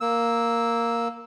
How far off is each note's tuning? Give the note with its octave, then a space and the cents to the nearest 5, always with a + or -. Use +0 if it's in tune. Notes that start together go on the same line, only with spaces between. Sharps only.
A#3 +0 E6 -10